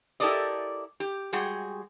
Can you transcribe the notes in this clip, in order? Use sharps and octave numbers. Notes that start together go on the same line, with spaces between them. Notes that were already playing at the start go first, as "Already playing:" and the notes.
E4 G4 A4 A#4 D5 D#5
G4
G3 G#3 F#4 G#4 G5